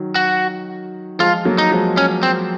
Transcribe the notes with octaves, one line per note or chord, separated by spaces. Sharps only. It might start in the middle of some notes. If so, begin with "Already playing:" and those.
Already playing: D#3 F#3
F#4
F3 G#3 F4
F#3 A#3
D#4
F3 G#3
C#4
C4